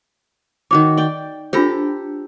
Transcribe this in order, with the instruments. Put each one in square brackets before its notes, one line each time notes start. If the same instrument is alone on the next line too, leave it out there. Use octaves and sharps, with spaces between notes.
[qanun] D#3 F#4 C#5 [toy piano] D6
[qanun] D5 G5
[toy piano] D4 F4 C5 [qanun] G4 A4 A#5